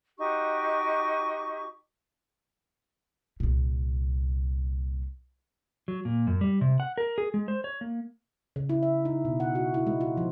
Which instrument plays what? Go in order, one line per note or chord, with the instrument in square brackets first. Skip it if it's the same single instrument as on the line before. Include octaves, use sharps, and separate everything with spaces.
[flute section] D#4 F#4 G4 C#6
[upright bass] C2 A#2
[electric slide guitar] F#3
A#2
F#2
G3
C3
F#5
A#4
G#4
G#3
C5
C#5
A#3
[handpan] C#3
E4
E5
D#4
B2
F#5
F#4
E4
G#3
F4
F3